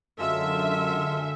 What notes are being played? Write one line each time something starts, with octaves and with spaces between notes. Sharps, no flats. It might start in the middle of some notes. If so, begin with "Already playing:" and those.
F#2 D3 G#3 F4 A4 E5